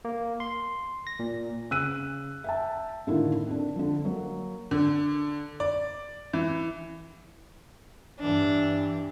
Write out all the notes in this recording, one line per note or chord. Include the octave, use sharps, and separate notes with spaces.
A#3
C6
A#6
A#2
C#3 E6 F#6 D#7
E5 G5 A5
A2 D3 D#3 A#3 E4 F4
C4 D4
D3 F3
F#3 A#3
D3
D5
E3
G2 E3 D4